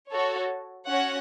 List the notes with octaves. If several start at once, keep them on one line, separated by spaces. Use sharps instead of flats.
F#4 A4 C#5
C#4 F#4 C#5 F#5